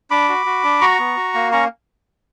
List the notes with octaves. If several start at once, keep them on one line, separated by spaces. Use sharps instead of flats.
D4 B5 D6
F#4
F#4
D4
F#4 A#5 C#6
B3
F#4
A#3
C#4 A#5 C#6